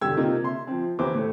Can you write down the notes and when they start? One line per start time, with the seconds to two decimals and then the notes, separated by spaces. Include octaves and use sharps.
0.01 E1 G2 D3 G4 E6 G#6
0.17 C3 A#3 D#4 F4
0.44 E5 C6
0.67 F3 C4
0.99 D#2 E3 E4 C5 D6
1.14 A2 A3